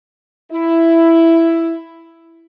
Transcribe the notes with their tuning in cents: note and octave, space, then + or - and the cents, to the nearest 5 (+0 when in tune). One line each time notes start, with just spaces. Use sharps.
E4 +5